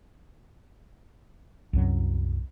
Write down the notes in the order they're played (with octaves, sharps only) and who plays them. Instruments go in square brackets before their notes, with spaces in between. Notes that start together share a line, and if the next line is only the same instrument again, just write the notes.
[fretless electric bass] C2 F#2 F#3